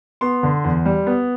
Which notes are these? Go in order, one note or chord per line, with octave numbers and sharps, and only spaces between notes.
B3 C6
D3
E2
G3
B3